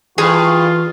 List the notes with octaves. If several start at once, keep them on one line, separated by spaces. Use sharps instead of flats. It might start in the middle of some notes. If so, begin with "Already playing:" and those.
G2 E3 F4 G#4